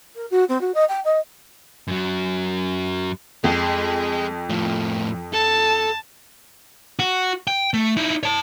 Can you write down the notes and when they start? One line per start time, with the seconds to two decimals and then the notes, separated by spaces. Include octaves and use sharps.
0.16 A#4
0.31 F#4
0.49 C4
0.61 F#4
0.74 D#5
0.89 G5
1.05 D#5
1.88 F#2 F#3
3.44 F2 G#3
4.49 A2 F3
5.33 A4 A5
6.99 F#4
7.47 G5
7.74 A3
7.96 D#4 E4
8.23 C#5 A5